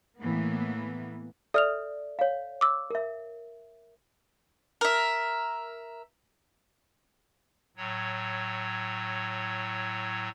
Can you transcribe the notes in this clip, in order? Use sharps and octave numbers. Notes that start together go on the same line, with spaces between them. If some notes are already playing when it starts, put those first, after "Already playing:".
A2 E3 A#3 B3
A4 D5 E5 D#6 F6 F7
C#5 F5
D6 E6
A#4 E5
A#4 E5
A2 F#3 C#5